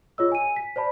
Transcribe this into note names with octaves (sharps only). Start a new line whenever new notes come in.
F4 G#4 C#5 D#5 E6
G#5 D#7
B6
C5 D5 A5 B5